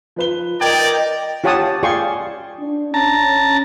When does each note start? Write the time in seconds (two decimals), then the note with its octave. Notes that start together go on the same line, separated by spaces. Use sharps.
0.16 F3 B4 G7
0.61 A#4 D5 D#5 G5 G#6
1.44 F4 G4 C#5 F#5 A5 D#6
1.83 F4 G#4 D5 G5 C6 C#6
2.60 D4
2.94 C#4 A5 A#5